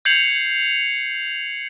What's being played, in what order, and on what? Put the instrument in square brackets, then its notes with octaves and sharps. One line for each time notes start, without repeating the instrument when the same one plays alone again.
[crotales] G6 G#6 C7 C#7 F7 F#7